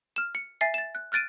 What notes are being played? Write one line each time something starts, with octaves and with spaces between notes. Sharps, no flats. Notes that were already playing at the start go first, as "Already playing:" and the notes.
F6 E7
C#7
E5 G#5 A6 C7
A6 E7
F#6
F6 F#6 A6 D7 D#7